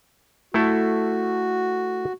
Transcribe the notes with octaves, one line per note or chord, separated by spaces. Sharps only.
A3 E4 F#4 A4